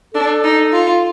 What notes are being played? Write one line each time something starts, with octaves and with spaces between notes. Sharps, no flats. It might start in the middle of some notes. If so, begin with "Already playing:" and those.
D4 A4
D#4
F4